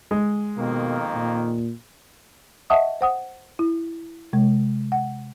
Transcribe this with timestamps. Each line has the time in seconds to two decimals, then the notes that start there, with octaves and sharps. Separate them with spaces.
0.11 G#3
0.58 F2 B2 D#3 A#3
1.15 A#2
2.70 D#5 E5 F#5 A5 C#6 D#6
3.01 C5 F#5 D#6
3.59 E4
4.33 C3 G#3
4.92 F#5